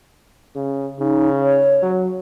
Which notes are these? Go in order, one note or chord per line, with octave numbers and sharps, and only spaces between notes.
C#3
C#3 D#4
C#5
F#3